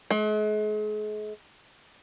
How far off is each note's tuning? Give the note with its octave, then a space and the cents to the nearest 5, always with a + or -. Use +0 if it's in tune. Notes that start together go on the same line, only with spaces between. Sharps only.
G#3 +40